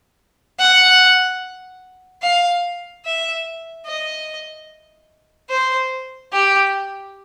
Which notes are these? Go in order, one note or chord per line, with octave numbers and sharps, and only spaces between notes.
F#5
F5
E5
D#5
C5
G4